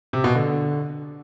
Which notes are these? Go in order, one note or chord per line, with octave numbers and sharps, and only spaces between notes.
C3
B2
D3